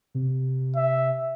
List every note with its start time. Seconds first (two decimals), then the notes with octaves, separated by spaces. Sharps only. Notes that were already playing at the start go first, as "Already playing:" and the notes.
0.15 C3
0.76 E5